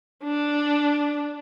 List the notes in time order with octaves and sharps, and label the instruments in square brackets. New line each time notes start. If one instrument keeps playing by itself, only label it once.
[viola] D4